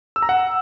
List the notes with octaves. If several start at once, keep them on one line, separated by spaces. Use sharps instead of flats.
E6
A#5
F#5